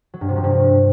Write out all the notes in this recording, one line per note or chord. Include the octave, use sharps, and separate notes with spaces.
F#3
G2
C3
F3
G2